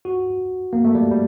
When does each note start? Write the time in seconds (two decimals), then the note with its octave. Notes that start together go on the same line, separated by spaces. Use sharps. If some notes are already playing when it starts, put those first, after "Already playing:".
0.05 F#4
0.73 A#3
0.85 A3
0.95 G3
1.11 G3